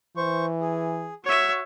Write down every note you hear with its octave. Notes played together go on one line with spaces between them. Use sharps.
E3 C5 C#6
G#4
F#4 C#5 E5